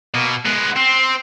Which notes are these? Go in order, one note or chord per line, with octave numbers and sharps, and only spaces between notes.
B2 A#3
G#3 B3 F#5
C4 C6